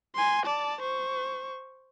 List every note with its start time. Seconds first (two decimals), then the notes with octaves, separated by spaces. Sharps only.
0.15 G#5 C6
0.46 D5 A5
0.81 C5 C#6